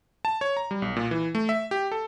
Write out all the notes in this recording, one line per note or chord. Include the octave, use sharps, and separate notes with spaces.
A5
C#5
A#5
G3
B1
A#2
E3
A3
E5
G4
A4